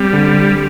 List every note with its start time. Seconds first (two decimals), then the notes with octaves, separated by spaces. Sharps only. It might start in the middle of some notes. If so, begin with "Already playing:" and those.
Already playing: G3 C4
0.13 D3